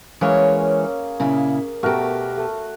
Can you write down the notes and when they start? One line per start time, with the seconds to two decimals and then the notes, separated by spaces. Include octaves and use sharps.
0.21 E3 G#3 A#3 C#4 G#4 C#5
1.20 A#2 C#3 E4
1.83 B2 A3 F#4 G4 A#4
2.38 A3